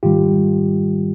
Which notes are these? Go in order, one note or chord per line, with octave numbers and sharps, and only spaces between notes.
G#2 D#3 G3 F4 G4